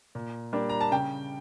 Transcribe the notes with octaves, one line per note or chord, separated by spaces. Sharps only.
A#2
G3 A#3 D4
A#5
A5
C#3 G5